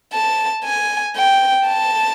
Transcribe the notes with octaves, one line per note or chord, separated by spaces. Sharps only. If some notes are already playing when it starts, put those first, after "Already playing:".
A5
G#5
G5
A5